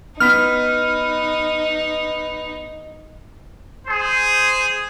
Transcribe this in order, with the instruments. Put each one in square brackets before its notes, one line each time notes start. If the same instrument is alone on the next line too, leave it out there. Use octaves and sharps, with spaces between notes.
[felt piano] B3 B6 [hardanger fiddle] D#4 [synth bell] F6
[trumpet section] G#4 C5